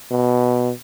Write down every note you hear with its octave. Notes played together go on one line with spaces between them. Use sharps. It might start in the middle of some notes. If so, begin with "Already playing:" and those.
B2